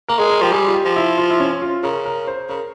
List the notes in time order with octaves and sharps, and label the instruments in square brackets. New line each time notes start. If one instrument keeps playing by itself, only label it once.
[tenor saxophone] A#3 [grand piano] A#4
[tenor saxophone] G#3 [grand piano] G#4
[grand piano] A#4
[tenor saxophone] F3 [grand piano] G4
[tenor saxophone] G3 [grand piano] G#4
[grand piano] F4
G4
[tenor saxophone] F3
[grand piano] E4
F4
E4
C#4
F4
[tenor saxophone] C#3 [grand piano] A#4
[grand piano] A#4
C5
[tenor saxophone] C#3 [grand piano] A#4